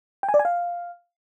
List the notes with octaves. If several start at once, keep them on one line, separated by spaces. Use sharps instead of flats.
G5
G#5
D5
G#5
F5